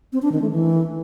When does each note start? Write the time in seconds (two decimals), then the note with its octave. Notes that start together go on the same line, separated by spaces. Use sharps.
0.13 C4
0.22 D4
0.32 D#3
0.42 A3
0.51 E3